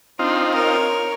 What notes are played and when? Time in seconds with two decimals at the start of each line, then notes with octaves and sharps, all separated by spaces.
0.19 C4 D4 D#4 F4
0.54 A#4 C#5